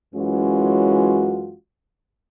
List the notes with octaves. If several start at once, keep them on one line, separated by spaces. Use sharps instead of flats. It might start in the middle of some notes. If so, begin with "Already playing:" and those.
F#2 E3 G#3 C#4 F4 F#4